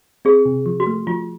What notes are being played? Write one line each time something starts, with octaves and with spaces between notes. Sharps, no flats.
C4 G#4
C3
F3
F#4
A3
F3 F4